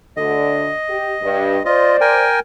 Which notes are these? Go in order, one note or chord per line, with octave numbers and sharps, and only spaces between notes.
D2 D3 D#5
G4
G2
F4 C5 D5 D#5
A#4 G5 G#5